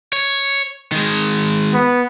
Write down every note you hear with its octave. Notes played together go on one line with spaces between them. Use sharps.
C#5
D#3 G#3
B3